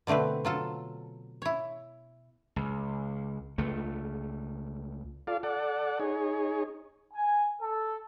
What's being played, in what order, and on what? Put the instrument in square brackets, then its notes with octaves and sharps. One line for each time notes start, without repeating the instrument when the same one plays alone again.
[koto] B2 D3 A3 C4 B4
F#3 F4 A4
E4 C#5
[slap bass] C#2
C#2 A3
[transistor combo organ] F4 A4 D5 F5
A4 D5 F#5
D#4 G#4 C#5
[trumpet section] G#5
A4